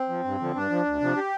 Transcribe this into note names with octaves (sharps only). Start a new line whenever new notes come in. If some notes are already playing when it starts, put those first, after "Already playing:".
Already playing: C4
F3
G2
D3 F3
G2 D4
F3
D2
C3 F3
G4